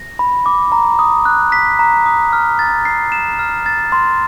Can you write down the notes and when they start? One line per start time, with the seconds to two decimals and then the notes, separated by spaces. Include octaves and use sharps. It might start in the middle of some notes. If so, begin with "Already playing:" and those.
Already playing: A#6
0.19 B5
0.46 D6
0.72 A#5
0.99 D#6
1.25 F#6
1.52 B6
1.79 A#5
2.06 D#6
2.33 F6
2.59 A6
2.85 C7
3.12 E7
3.39 F6
3.66 A6
3.92 C6